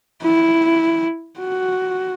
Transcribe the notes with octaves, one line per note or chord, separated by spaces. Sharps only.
E4
F#4